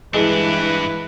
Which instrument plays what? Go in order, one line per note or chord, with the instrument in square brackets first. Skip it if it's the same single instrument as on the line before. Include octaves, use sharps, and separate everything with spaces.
[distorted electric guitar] G2 D4 [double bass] E3 [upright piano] G#3 [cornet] B4